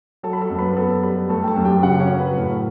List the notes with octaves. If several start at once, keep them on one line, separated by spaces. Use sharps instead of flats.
F#3 A4 A5
B5
A4 A5
F#2
B4 B5
B3 A4 A5
G3 B4 B5
A3 A4 A5
G5
A4 A5
F#2
G4 G5
C#3 F#4 F#5
C#4 C#5
F#3
B4
A2 A4